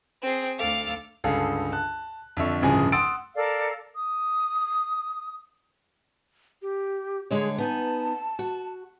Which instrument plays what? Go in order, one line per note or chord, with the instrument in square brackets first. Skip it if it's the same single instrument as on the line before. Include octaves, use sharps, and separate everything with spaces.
[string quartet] C4 G#4
D2 A4 F5 D6
[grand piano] C#2 G2 D3 G#4 A4 F5
A5 F#6
F2 D3 E5 C#6
D1 G2 C#3 F3 G#4 G#5
F#5 C6 D#6 E6 A6 D7
[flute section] A4 A#4 D5 F5
D#6
[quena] G4
[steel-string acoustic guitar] D3 G#3 C#5 [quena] G#4
[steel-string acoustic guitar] B3 D#4 G#5 [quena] A5
[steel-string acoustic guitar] F#4